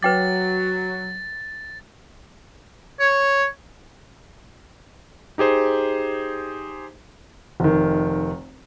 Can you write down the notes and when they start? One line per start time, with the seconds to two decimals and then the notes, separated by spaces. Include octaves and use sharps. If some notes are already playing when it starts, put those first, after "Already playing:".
0.03 F#3 B4 G5 D6 A6
3.00 C#5
5.38 D#4 G4 G#4 C5
7.60 F1 D#3